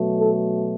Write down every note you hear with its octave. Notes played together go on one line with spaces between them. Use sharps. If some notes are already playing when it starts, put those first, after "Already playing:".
Already playing: B2 F#3 A3
A4